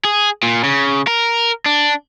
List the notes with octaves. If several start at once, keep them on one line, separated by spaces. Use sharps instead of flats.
G#4
A#2
C#3
A#4
D4